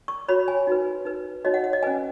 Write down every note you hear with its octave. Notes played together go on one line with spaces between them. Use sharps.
C#6
F#4 C#5 B5
G#5
D#4 F#4 B4
D#4 B4
D#4 F#4 C#5 D#5
F#5
F#5
D#5
C#4 B4 G#5